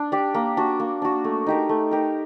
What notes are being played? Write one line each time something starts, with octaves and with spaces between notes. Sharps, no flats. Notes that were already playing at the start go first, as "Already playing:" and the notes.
Already playing: D4
G4 D5
A#3
D4 F#4
A#3
D4 F#4
A3
D#4 G4 A#4
A3
D#4 G4 A#4